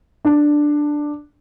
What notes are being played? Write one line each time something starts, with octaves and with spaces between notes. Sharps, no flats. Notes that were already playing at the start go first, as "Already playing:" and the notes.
D4